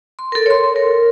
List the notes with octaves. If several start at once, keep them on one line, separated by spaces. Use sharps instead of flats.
C6
A4 A#4
C#5 C6
A#4